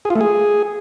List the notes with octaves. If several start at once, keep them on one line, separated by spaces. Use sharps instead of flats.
G#4
F4
A3
G#4